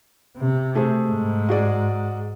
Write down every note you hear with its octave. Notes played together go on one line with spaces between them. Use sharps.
C3
A3 G#4 C5
G#2
F#4 G#4 D5